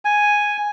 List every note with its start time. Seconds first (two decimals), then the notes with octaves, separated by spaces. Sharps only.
0.05 G#5